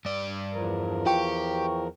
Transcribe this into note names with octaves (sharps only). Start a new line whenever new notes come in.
G2 D5
E2 F3 A#4
F4 G4 G5 C#6